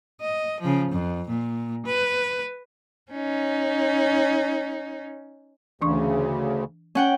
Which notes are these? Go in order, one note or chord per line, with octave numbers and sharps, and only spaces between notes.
D#5
C#3 F3
F2
A#2
B4
C#4 D#4
D2 C#3 E3 D4 C#6
C#4 F#5 G5